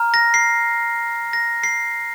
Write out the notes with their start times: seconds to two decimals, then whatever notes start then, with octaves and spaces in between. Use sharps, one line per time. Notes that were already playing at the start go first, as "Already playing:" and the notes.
Already playing: A#5 F6
0.14 A#6
0.34 C7
1.33 A#6
1.63 C7